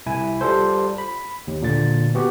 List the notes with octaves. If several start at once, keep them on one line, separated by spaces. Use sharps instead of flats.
C2 E4 G#5
G3 F4 A4 C5
B5
D#2
A#2 D3 A6
B3 F#4 G4